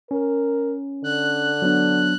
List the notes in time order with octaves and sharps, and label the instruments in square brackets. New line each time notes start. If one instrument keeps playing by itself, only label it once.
[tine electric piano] C#4 [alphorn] A#4
[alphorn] D3 [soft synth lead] F#6
[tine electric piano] F#3 B3 D4